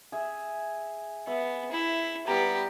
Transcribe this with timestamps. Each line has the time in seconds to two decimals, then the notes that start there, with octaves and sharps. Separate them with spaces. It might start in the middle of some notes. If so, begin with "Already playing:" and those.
0.12 G#4 E5
1.27 B3 E5
1.72 E4
2.27 G3 B3 G4 A#5